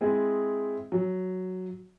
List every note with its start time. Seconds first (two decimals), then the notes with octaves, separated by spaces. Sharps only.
0.01 G#3 C4 E4 G#4
0.92 F#3